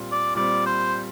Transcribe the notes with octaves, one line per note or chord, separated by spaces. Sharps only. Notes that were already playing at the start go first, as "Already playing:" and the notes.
Already playing: A#2 G3 C4
D5
A#2 G3 C4 D5
C5